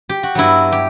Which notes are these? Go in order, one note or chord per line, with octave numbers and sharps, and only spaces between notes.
G4
F#4
G2 F#3 B3 E4
G4